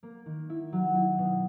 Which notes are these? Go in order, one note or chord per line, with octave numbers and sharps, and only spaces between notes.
A#3
D#3
E4
F#3
E4
B2